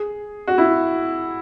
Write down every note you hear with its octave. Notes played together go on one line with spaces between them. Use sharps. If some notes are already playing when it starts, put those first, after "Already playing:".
Already playing: G#4
F#4
E4